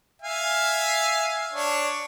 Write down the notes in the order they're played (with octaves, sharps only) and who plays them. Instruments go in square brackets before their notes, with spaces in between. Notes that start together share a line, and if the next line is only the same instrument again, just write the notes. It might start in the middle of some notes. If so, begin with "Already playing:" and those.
[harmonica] E5 F5 G#5
D4 C#5